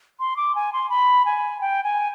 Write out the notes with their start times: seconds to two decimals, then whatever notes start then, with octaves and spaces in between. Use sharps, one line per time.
0.20 C6
0.37 D6
0.55 G#5
0.73 C6
0.90 B5
1.26 G#5
1.61 G5
1.84 G#5